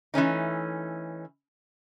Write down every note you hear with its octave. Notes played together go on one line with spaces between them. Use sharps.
E3 A3 C#4 D#4